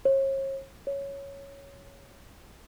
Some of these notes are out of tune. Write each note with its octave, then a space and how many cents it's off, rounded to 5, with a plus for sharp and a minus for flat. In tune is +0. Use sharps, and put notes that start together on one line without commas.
C#5 -40
C#5 +0